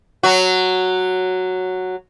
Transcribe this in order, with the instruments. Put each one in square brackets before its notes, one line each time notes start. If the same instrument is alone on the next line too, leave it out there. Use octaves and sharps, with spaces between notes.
[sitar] F#3 F#4